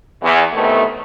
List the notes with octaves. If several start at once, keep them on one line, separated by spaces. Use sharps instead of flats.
E2
A2 C3 D#3 A3 B3